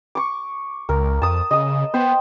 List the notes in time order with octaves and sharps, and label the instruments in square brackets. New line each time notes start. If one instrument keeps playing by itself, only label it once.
[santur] C#6 D6
[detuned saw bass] C#2 [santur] A#4
[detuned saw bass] F2 [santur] A5 D#6
[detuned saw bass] C#3 [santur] D#5 D#6
[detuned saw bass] B3 [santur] C5 G5